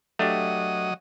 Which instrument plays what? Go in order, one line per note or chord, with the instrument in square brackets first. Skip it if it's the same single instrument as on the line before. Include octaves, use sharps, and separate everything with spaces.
[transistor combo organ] F#3 D#5 [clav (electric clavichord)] A3 D4 G4